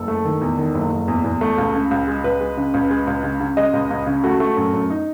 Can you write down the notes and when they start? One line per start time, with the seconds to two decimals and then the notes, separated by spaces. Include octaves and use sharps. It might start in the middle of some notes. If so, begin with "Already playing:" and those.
Already playing: F#1 A4
0.08 A3
0.25 D#3
0.41 E2
0.58 D#3
0.75 F#1
0.91 F#1
1.08 E2
1.24 E2
1.41 A3
1.58 C#2
1.75 C#3
1.91 C#2
2.08 G#3
2.24 C#2 B4
2.41 G#3
2.57 C#3
2.74 C#2
2.90 G#3
3.07 C#2
3.24 C#3
3.40 C#3
3.57 G#3 D#5
3.73 C#2
3.91 C#2
4.07 C#3
4.24 A3 F#4
4.40 A3
4.57 F#2
4.74 F#2
4.90 D#4